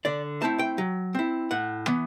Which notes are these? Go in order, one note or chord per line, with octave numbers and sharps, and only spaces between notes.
D3 D5
A3 C4 E4 A5
G5
F#3
C4 E4
A2 F#5
E3 B3